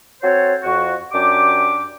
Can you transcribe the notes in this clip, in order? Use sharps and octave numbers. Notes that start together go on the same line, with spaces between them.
C4 F#4 A4 C5 C#5
F2 F#4
F#2 D4 G4 D6